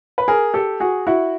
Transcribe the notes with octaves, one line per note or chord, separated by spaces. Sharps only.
B4
G#4 A#4
G4 A4
F#4 G#4
E4 F#4